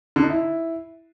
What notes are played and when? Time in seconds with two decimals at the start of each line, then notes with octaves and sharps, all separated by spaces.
0.16 D3
0.23 D#4
0.30 E4